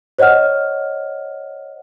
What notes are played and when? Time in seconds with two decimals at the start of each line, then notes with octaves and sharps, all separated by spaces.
0.19 C5 C#5 D#5 F#5 F6